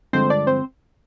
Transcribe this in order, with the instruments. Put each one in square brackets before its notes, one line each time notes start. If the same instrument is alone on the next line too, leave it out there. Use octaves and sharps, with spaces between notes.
[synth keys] G2 D3 F3 G#3 C4 C5
D4 D5
C4 C5